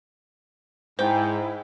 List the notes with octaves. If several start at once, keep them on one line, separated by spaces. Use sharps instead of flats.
G#2 E4 C5 G5